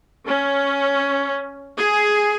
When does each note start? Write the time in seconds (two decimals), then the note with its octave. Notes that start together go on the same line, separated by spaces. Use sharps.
0.25 C#4
1.76 G#4